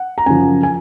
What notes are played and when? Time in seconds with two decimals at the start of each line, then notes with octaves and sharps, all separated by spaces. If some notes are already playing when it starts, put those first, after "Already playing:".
Already playing: F#5
0.18 A#5
0.26 F#2 C#3 F3 G#5
0.63 G#5